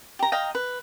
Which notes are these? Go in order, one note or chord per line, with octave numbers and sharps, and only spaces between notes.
G4 A#5
D#5 F5 G5 A#5
B4